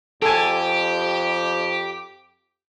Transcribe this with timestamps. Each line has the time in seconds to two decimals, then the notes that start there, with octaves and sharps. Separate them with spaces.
0.22 F2 G4 A4 G#5